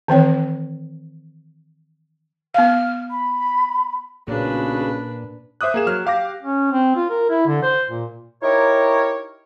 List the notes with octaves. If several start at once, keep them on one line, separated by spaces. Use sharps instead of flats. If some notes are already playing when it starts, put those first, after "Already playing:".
D#3 E3 C4 C#5
B3 F5 F6
B5
B1 A#2 C#3 D4 B4
C5 E5 D6 D#6 F#6
A#3 G#4 E7
F#3 F6
G4 F5 D6 A#6
C#4
C4
F4
A#4
E4
D3
C5
A#2
D#4 E4 G4 A#4 C#5